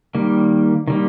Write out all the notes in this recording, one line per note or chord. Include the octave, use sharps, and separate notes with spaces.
D#3 G3 A#3
D#3 G3 A#3